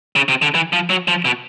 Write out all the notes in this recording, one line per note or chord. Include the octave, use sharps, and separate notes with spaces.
C#3
C3
D3
E3
F3
F#3
F3
B2